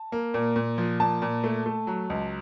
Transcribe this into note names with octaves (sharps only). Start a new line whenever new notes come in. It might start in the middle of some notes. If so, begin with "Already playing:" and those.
Already playing: A5
A#3
A#2
A#2
F3
A#2 A5
A#2
A3
A3
F#3
C#2